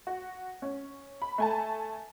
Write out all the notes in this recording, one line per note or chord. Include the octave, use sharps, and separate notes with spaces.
F#4
C#4
B5
A3 G#5 A5